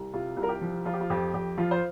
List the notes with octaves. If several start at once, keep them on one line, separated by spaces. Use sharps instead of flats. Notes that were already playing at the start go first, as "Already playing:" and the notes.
Already playing: C2
C3 F4
C2
A#4
G4
F3
F3 F4
G4
F4
F2 G4
F2 G4
F3 F4
C5